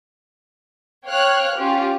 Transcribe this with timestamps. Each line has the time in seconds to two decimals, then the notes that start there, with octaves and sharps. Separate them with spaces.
1.06 C#5 F5 G5 F6 F#6
1.57 C#4 F4 G4